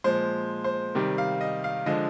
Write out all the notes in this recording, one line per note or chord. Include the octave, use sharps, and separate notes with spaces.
A#2 F3 G#3 C5
C5
C3 D#3 G3
F5
D#5
F5
D3 F3 G#3 D#5